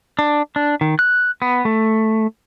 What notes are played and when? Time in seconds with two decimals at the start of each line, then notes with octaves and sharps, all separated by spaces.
0.19 D4
0.56 D4
0.81 D#3
0.99 F#6
1.42 B3
1.65 A3